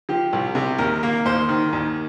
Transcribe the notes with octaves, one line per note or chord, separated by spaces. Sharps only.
F3 G4
C2
C3
D#2 A#4
A#3
D#2 C5
D#3
D#2